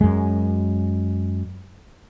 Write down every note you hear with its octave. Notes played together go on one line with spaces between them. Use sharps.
F#2 G#3